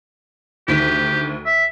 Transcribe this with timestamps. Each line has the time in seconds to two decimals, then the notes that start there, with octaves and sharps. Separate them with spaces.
0.68 D2 D#3 G4 B6
1.46 E5